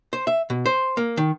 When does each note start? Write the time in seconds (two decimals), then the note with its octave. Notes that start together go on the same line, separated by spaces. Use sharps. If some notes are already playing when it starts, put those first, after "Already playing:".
0.13 C5
0.27 E5
0.50 B2
0.66 C5
0.97 A#3
1.17 D#3